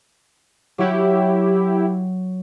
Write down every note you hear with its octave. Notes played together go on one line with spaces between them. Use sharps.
F#3 E4 F#4 G4